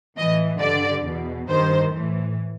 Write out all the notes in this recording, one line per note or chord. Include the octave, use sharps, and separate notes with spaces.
A2 E3 D#5
G2 D3 D5
E2 B2
G2 D#3 C5
A2 E3